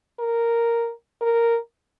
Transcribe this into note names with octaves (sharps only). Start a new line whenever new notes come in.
A#4
A#4